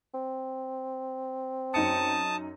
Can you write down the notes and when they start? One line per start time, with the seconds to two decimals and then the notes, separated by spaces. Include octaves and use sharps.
0.14 C4
1.74 F#2 D#4 A5 D#6 C#7